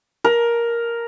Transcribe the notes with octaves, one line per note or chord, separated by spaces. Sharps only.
A#4